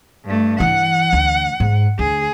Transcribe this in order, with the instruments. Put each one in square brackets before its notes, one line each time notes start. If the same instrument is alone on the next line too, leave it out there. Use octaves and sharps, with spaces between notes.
[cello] G2 A3
[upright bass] E3 [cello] F#5
[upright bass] D2
G#2
[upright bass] D2 [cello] G#4